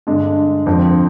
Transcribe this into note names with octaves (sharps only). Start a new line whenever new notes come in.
G2 D3 G#3 D4
F2 D3 F3 C4